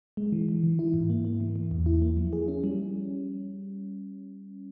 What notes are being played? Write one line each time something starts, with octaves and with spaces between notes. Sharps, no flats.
G#3
E3
E3
E3
E4
G#2
A#3
A#3
E3
E3
E2
E4
A#3
F3
G#4
C#4
G3